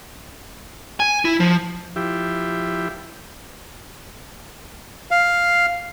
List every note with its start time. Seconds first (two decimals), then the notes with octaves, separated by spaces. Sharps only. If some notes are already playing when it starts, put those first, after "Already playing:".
1.00 G#5
1.25 E4
1.40 F3
1.96 F3 E4 G4
5.11 F5